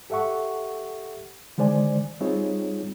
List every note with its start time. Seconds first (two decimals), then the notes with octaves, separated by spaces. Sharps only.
0.10 G4 A4 E5 F#5 C#6
1.58 D3 D#3 G#3 C5 D5 G#5
2.21 G3 C4 D#4 F4 G#4 C#5